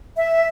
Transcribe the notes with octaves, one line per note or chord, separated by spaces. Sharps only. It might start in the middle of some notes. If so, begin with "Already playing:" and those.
E5